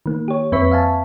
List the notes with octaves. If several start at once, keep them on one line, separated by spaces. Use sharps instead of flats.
D#3 A#3
G4 C#5
F2 C4 B4 E5 C#6 B6
E5 F5 G#5 A5